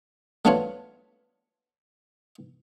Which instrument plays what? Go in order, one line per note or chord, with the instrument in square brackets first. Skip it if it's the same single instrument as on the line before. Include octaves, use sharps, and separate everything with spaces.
[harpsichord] A3 B3 D4 F4 F#4 C#5